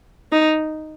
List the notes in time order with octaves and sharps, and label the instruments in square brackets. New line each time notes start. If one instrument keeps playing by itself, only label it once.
[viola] D#4